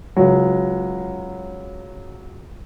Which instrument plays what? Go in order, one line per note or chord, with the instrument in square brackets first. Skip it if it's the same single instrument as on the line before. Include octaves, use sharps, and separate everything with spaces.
[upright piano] C#2 F#3